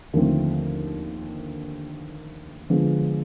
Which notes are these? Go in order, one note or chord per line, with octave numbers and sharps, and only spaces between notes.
D#2 D3 F3 A3 C4
D3 F3 G#3 B3